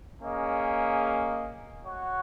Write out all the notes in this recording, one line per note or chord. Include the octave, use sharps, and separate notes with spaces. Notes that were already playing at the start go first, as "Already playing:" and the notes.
A#3 C#4 G#4 D#5
F#4 C#5 F#5